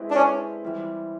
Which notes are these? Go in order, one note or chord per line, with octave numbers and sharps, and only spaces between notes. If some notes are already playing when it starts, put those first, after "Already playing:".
Already playing: G#3 C4 E4 G4 B4
D4
C#4
E3 G3 C4